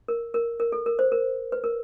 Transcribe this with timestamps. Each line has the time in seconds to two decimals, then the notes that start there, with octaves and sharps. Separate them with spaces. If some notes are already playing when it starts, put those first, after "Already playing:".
0.08 A#4
0.34 A#4
0.60 A#4
0.72 A4
0.86 A#4
0.99 C5
1.12 A#4
1.52 B4
1.64 A#4